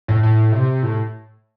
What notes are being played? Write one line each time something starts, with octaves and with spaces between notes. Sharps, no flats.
A2
A2
C3
A2